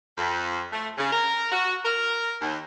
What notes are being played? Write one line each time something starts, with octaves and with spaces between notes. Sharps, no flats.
F2
A3
C#3
A#4
F#4
A#4
D#2